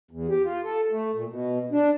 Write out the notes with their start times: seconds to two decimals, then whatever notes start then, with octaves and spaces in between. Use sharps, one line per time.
0.11 E2
0.29 G4
0.44 F4
0.65 A4
0.91 A3
1.14 A#2
1.29 B2
1.72 D4